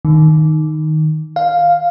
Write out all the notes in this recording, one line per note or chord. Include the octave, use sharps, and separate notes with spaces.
D#3
F5